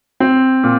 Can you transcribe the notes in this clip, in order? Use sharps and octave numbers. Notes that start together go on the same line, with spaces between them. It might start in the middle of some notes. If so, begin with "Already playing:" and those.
C4
A#2